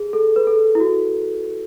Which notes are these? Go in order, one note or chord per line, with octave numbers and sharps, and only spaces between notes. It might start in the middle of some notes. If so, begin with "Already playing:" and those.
Already playing: G#4
A4
B4
A4
E4
F#4